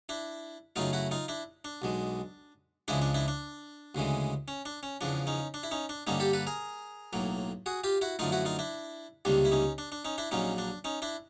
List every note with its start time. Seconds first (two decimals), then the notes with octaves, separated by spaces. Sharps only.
0.09 D4 E4
0.76 F#2 C#3 F#3 A3 D#4 F4
0.93 E4 F#4
1.11 D#4 F4
1.28 D4 E4
1.65 D4
1.82 B1 B2 G#3
2.88 C#2 C#3 F3 G#3 D4 E4
3.02 D4
3.14 D4 E4
3.28 D4
3.95 D2 C#3 E3 G#3
4.48 C#4
4.65 D4
4.83 C#4
5.01 E2 C#3 F3 D4
5.27 C#4 D#4
5.54 D4
5.63 E4
5.71 C#4 D#4
5.89 D4
6.07 G2 D3 G3 A#3 C#4 D#4
6.20 G4 A4
6.33 A4 B4
6.47 G#4 A#4
7.13 B1 A2 F#3 A#3
7.66 F#4 G#4
7.84 F4 G4
8.01 E4 F#4
8.19 F#2 D3 F3 A3 D#4 F4
8.32 E4 F#4
8.45 D#4 F4
8.59 D4 E4
9.25 C#2 C3 D#3 G3 A#3 D4
9.45 E4
9.52 C#4 D#4
9.78 D4
9.92 D4
10.05 C#4 D#4
10.18 D4 E4
10.31 A#1 A#2 F#3 A#3 C#4 D#4
10.58 D4
10.84 C#4 D#4
11.02 D4 E4